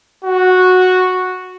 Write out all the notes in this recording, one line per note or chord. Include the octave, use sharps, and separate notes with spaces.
F#4